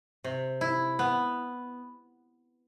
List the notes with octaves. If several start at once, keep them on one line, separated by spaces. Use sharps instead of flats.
C3
E4
B3